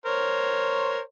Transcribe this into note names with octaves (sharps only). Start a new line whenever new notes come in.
A#4 C5 C#5